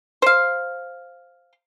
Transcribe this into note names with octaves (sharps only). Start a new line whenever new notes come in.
C5 F5